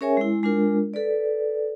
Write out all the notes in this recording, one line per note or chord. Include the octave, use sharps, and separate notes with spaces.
C#4 G#4 A#4 C#5 E5 G#5
G#3 E4
G#3 D4 F4 A#4
A4 B4 D5